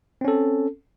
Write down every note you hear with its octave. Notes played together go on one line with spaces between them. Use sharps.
C4 C#4 A4